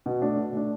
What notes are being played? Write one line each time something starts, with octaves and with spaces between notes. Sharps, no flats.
B2
A3 D4
B2
A3 D4